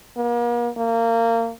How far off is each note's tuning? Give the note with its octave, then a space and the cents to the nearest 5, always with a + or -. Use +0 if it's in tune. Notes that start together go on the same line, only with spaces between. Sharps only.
A#3 +40
A#3 -25